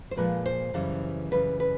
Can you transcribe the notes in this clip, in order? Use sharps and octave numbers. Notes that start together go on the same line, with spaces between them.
C5
A#2 F3 G#3 B4
C5
F#2 C#3 E3 G3
F#2 C#3 E3 G3 B4
B4